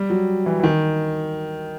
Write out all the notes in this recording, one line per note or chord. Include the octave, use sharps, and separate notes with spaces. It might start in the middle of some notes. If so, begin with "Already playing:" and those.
Already playing: G3
F#3
E3
E3
D#3